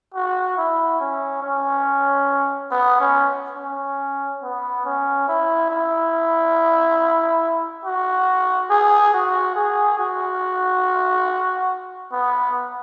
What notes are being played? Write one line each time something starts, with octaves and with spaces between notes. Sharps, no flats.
F#4
E4
C#4
C#4
B3
C#4
C#4
B3
C#4
E4
E4
F#4
G#4
F#4
G#4
F#4
B3